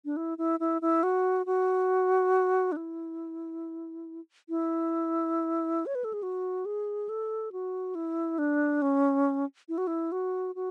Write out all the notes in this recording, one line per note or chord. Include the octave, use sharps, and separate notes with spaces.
D4
E4
E4
E4
E4
F#4
F#4
D4
E4
E4
C#5
B4
A4
G#4
F#4
G#4
A4
F#4
E4
D4
C#4
E4
F#4
E4
F#4
F#4